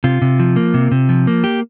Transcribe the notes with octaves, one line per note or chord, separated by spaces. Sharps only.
C3 F4
C3
F3
A#3
C3
C3
F3
A#3
G4